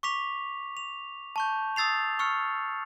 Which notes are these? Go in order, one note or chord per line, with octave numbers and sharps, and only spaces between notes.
C#6 D6 B6 F7
F7
A5 C#6 G6
D#6 E6 A6 C7 F7
C#6 E6 F6 C#7